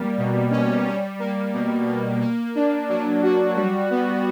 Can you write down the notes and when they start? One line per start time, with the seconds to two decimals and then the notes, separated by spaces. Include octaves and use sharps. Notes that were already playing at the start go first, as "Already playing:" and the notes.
Already playing: G3 A#3
0.18 B2
0.51 C#4
0.85 G3
1.19 A#3
1.54 B2
1.87 B2
2.21 A#3
2.55 D4
2.89 F#3
3.22 F#4
3.56 G3
3.90 B3